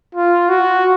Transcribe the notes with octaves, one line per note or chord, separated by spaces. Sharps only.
F4
F#4